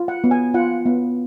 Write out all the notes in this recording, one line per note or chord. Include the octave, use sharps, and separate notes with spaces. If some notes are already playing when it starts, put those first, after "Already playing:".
Already playing: F4
F#5
B3
G#5
F4 F#5
B3